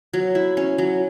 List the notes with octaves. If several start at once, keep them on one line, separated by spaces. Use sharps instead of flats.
F#3
E4
C#4
F#3